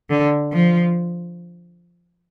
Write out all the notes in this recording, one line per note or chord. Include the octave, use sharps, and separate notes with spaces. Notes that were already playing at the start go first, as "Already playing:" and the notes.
D3
F3